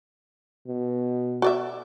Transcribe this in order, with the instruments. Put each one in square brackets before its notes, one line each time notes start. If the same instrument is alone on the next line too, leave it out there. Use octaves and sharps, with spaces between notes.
[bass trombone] B2
[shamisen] F#4 D5 E5